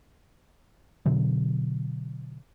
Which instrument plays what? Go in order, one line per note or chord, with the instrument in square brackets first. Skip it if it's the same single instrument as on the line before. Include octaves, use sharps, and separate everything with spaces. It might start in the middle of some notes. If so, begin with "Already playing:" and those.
[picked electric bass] B2 D3 F#3